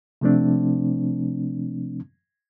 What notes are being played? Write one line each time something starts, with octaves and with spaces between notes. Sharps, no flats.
C3 F3 A3 C4 D4